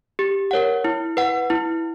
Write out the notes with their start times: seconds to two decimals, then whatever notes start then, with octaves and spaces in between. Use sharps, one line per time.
0.19 G4
0.51 A#4 C#5 F#5
0.84 E4
1.17 B4 F#5
1.50 E4